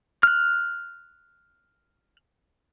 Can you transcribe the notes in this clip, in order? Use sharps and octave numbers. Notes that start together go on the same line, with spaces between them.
F6 F#6